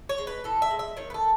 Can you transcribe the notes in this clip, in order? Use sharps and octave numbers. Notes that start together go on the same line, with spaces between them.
C#5
G#3
B4
A2 A4
E5
G#3
E5
D#3 C#5
B4
A4